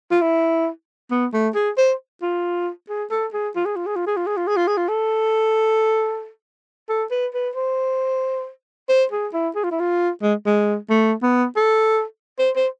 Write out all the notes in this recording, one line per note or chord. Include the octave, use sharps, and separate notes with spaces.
F4
E4
B3
A3
G#4
C5
F4
G#4
A4
G#4
F4
G#4
F4
G#4
F4
G#4
F4
G#4
F4
G#4
F4
G#4
F4
A4
A4
B4
B4
C5
C5
G#4
E4
G#4
F4
E4
F4
G#3
G#3
A3
B3
A4
C5
C5